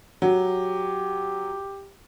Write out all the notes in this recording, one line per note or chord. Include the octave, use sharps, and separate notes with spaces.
F#3 G4